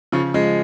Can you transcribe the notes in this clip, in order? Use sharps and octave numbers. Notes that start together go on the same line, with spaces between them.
C#3 F3
F3 G#3